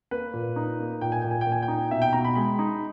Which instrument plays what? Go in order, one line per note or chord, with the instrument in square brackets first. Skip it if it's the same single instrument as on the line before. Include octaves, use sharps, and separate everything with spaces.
[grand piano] A#3 B4
A#2
D#4
A#3
A#2 G5
G#5
A#2 G5
G#5
G5
A#2
G#5
G5
D#4
B2 E5
G5
B2 A#5
B5
G#3 B5
D#4